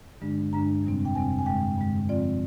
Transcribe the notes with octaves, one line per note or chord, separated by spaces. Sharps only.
G2 D3 G#3 D4
G2 D3 G#3 D4 A#5
F2 C3 G3 C4
G5
F2 C3 G3 C4 G#5
G#5
G2 D3 G#3 G5
G2 D3 G#3
D3 F3 C4 F4 D5